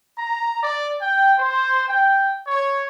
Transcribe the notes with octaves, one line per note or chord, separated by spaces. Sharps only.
A#5
D5
G5
C5
G5
C#5